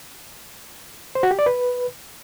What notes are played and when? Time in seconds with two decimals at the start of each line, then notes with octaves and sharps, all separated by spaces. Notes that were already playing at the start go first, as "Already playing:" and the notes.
1.15 C5
1.23 F#4
1.31 G4
1.39 D5
1.46 B4